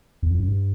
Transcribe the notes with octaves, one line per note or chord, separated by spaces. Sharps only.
E2
F2
F#2
G2